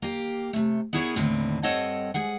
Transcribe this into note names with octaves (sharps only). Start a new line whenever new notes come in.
A#3 G4
C3 A3
B3 E4 G#4 A#4 C#5
D#2 A2 D3 D#3 C4 B4
G2 C4 A4 C#5 D#5 F#5
G#2 G#4 F#5